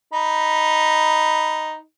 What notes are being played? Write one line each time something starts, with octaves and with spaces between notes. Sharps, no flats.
D#4 B5